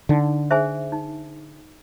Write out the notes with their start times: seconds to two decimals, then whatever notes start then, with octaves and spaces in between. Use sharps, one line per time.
0.09 D3 D#4
0.51 G#4 C5 E5 G#5
0.92 D#4